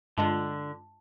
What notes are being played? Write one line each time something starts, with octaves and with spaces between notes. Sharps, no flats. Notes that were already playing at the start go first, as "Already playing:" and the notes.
G2 D3 G#3 F4 A5